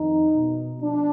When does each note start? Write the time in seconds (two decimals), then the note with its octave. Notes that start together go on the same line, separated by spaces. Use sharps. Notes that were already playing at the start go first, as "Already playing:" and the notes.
Already playing: F2 D#3 D#4
0.35 B2
0.82 F3 D4